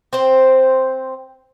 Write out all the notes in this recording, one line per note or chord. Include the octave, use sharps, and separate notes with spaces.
C4 C5